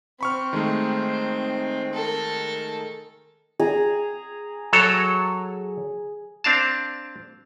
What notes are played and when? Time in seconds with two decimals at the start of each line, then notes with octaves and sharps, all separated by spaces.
0.21 C4 B5 C#6 F6
0.53 D#3 G#3 A3
1.93 A4 A#4
3.60 G#4 A#5
4.73 F#3 A4 C#5
6.44 C4 D4 F5 A5